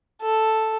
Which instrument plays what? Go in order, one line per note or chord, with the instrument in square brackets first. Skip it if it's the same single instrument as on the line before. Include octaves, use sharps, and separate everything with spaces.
[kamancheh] A4